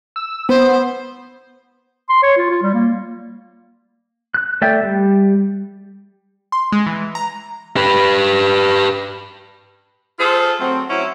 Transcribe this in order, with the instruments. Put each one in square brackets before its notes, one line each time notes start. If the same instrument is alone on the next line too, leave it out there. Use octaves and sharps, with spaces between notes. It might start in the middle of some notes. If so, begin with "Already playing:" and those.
[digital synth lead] E6
[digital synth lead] B3 [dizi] C5
[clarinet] C6
C#5
F4
F4
G3
A#3
[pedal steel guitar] F#6
A3 D5 E5 G5
G3
[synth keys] C6
G#3
E3
A#5
[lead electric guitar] G4 B4
[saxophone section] F4 G#4 A4 C5
F#3 A3 C4
F#3 C4 C#4 E4